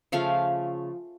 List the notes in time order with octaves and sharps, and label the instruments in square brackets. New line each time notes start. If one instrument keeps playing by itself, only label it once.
[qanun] C#3 F3 A3 F5